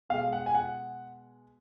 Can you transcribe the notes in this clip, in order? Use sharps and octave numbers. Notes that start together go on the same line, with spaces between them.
B2 G#3 F5
F#5
G#5
F#5